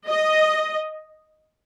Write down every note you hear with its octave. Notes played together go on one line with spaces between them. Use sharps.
D#5